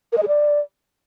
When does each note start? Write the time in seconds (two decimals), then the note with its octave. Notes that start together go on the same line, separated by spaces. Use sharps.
0.12 A#4
0.18 D#5
0.23 G#4
0.28 D5